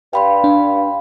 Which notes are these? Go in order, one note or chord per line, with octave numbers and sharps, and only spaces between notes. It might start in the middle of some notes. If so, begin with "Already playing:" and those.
G2 F5 G5 B5 C6
D4